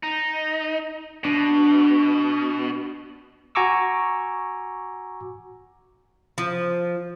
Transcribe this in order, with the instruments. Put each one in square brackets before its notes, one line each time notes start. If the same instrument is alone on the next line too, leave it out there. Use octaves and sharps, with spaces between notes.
[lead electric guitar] D#4
[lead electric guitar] B2 [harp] D4
[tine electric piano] F#4 G#5 A#5 C#6 D6 E6
[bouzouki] F3